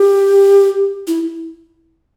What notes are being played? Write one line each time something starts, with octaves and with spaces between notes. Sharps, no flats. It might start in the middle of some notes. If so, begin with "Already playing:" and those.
Already playing: G4
E4